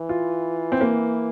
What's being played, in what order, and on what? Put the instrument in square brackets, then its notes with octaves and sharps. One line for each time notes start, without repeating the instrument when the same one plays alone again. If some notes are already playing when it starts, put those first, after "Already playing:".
Already playing: [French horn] E3
[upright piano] F4
C4
A#3